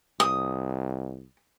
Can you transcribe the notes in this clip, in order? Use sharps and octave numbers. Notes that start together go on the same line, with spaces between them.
C2 D#6